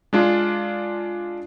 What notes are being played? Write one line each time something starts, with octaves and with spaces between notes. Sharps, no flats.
G#3 D4 F4